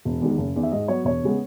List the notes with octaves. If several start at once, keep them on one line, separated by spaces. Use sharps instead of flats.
E1
E2 D#3 G#3
F#1
E2 D#3
E5
G#2 D#5
F#3 B3 C#5
E1 C#5
C#3 G#3 B3